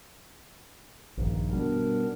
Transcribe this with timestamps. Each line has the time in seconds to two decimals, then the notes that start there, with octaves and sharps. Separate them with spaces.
1.17 A#1 G2 D#3
1.52 B2 G3 B3 D4 A#4